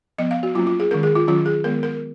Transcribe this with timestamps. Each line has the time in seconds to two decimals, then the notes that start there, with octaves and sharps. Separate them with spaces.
0.18 F3 B3 D#5
0.31 F5
0.43 F#4
0.55 F#3 A#3 C#4 F4
0.67 F4
0.80 G#4
0.91 D#3 G#3 C#4 A#4
1.03 G#4
1.15 F4
1.27 D#3 F#3 C#4 F4
1.46 G#4
1.64 D#3 G#3 B3 A#4
1.83 A#4